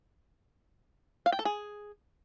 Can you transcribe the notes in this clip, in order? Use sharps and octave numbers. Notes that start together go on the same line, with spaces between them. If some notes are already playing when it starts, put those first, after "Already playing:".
F5
G5
A4
G#4